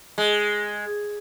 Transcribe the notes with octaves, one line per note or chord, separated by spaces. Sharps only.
G#3